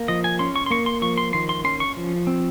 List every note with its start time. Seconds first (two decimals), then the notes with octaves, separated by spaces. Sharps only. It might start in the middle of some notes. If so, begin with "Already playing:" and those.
Already playing: A#3
0.08 F3 D#5
0.24 G#5
0.39 C#4 C6
0.56 C#6
0.66 C6
0.71 A#3 C#6
0.86 C6
1.02 F3 C#6
1.18 C6
1.33 D#3 C6
1.49 C6
1.64 C#4 C6
1.80 C#6
1.96 F3
2.27 C4